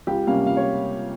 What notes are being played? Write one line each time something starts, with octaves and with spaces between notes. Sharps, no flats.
C#2 G4
C3 G3 A#3 C#4 F5
C#2 F5
C#5